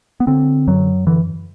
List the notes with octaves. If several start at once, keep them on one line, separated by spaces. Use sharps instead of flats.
B3
D3 C4
F#2 F#3
D3 E3